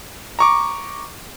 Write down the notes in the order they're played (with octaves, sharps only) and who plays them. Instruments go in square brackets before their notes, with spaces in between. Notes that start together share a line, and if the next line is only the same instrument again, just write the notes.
[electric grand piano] A#5 C#6 D6